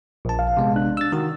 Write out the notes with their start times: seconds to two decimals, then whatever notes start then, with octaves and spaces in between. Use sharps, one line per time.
0.25 A#1 A5
0.39 F5
0.57 C3 G#3 B3
0.76 D4 F#6
0.97 E6 A6
1.12 D#3 F#4